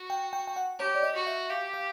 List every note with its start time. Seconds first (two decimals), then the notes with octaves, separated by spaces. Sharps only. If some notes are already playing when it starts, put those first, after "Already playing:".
Already playing: F#4
0.10 G5
0.33 G5
0.47 G5
0.56 F#5
0.79 G4 C#5
0.95 D5
1.03 D#5
1.15 F#4
1.27 E5
1.50 G4 F5
1.74 F5